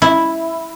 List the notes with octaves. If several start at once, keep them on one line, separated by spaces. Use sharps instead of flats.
E4